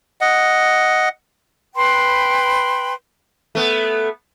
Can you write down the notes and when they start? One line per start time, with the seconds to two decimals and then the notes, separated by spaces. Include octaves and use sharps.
0.21 D#5 F#5
1.76 B4 G5 B5 C6
3.55 A3 B3